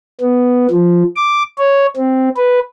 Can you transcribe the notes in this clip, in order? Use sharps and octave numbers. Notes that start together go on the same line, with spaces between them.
B3
F3
D6
C#5
C4
B4